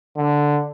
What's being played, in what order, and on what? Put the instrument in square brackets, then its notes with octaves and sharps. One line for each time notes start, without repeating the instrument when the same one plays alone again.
[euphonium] D3